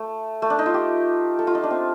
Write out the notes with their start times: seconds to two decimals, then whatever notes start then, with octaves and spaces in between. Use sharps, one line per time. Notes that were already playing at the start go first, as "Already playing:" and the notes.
Already playing: A3
0.42 A3
0.50 D4
0.59 D#4
0.66 F4
0.74 G4
1.39 A4
1.47 F4
1.55 D#4
1.64 D4
1.71 C4